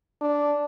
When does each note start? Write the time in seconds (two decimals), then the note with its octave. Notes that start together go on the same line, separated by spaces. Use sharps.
0.21 D4